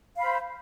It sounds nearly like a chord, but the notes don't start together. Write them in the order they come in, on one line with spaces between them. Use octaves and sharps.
F5 B5 C5